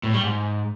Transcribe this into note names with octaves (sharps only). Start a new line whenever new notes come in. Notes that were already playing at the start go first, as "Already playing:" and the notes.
A2
G3
G#2